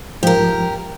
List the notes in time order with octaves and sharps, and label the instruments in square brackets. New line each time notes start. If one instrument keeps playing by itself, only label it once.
[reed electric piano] G#2 F3 [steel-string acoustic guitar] G4 A#4